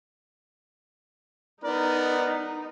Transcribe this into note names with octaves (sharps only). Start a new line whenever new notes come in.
B3 D#4 A#4 D5